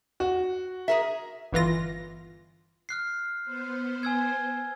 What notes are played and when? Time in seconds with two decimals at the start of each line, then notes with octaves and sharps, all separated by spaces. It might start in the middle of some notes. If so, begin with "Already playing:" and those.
0.20 F#4
0.88 G#4 A#4 E5
1.53 G1 E3 F4 A#6
2.89 F6 F#6 C7
3.45 B3 C5
4.03 G#5 E6 G#6